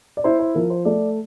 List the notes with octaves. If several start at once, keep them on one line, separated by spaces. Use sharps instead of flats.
D5
E4 C5
C5
F3 A#4
C5
A3 D5